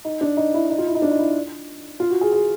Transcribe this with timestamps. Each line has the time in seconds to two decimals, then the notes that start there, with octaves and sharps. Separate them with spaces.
0.05 D#4
0.21 D4
0.37 D#4
0.54 E4
0.70 D#4
0.78 F4
0.87 E4
0.95 D#4
1.02 D4
1.11 D#4
1.19 E4
2.00 F4
2.10 F#4
2.21 G#4
2.32 G#4